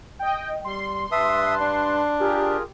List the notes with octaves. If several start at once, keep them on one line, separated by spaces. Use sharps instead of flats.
D#5 G5
G3 C6
G2 B4 E5 A5 D#6
D4
F4 G4 G#4 A#4